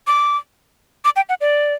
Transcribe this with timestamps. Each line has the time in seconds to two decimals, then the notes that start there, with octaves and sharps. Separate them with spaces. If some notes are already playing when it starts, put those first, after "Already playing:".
0.07 D6
1.05 D6
1.16 G5
1.29 F#5
1.41 D5